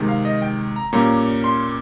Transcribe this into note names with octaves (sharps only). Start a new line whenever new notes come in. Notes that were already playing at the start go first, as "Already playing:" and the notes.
Already playing: C3 D#3 G#3
F5
D#5
G5
A#5
A#2 G3 A#3 C#4 A#5
C6